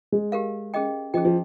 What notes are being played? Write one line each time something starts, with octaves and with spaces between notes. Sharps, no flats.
G#3
G4 A#4 F5
C#4 G#4 D#5 G5
F3 C#4 G#4 D#5 G5
F3